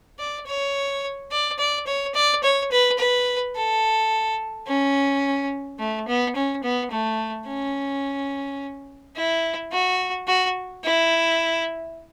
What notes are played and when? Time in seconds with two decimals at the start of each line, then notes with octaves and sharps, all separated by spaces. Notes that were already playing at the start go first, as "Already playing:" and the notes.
0.19 D5
0.47 C#5
1.32 D5
1.58 D5
1.87 C#5
2.15 D5
2.43 C#5
2.72 B4
2.99 B4
3.55 A4
4.67 C#4
5.79 A3
6.08 B3
6.35 C#4
6.63 B3
6.91 A3
7.47 C#4
9.16 E4
9.72 F#4
10.27 F#4
10.84 E4